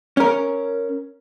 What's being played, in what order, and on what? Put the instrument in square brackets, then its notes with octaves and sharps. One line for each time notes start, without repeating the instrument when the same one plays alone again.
[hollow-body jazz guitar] C#4 A#4